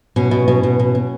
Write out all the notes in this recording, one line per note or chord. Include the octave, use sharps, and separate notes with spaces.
B2 C#4
B2
B2
B2
B2
B2